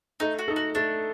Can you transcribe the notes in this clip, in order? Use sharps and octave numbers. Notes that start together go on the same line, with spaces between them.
A3 D#4
F#4
D#4 A4
F#4
A3 D4